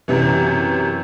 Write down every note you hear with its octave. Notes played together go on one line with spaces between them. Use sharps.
F#2 C3 E3